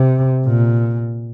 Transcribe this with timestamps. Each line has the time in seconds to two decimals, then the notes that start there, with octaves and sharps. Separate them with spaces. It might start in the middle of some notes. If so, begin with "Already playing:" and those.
Already playing: C3
0.46 A#2